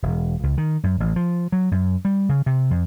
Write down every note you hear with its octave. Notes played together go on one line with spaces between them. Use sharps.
E1
C#2
D#3
F#2
A1
F3
F#3
F#2
G3
C#3
C3
F2